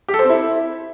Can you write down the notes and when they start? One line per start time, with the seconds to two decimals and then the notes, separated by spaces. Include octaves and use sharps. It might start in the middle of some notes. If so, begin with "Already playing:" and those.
0.08 G4
0.14 A4
0.19 C5
0.24 C4
0.30 E4